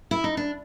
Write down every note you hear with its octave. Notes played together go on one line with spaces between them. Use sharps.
E4
D#4
D4